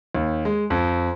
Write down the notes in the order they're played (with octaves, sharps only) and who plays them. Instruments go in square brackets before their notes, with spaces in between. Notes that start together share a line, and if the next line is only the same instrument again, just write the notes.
[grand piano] D#2
G#3
F2